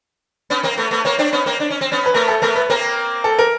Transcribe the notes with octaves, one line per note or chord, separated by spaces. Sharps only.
B3 C#4
A#3 C4
A3 B3
A3 B3
A#3 C4 C#5
C4 D4
B3 C#4
A#3 C4
D4
C#4
C4
B3 C#4
B4
A3 B3 A#4
A4
A3 B3 A#4
B4
A#3 C4 A#4
A4
A#4